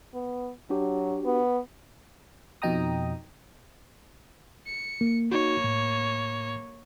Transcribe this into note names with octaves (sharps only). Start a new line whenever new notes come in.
B3
F#3 D4 F#4 G4
B3
F2 B2 D#4 G5 A#5 D#6
C#7
A#3
A#3 D#4 F#4 C#5
A2